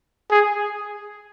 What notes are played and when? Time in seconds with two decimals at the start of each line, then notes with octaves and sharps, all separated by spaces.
0.31 G#4